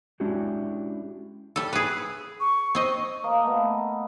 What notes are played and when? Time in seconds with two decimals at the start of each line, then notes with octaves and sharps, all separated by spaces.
0.20 G#3 C#4 D4 E4 F#4 G4
1.56 G3 A4
1.73 G#4 B4
2.40 C#6
2.75 C4 D#5
3.24 A#3 D#5 F5 D6
3.43 A3 B3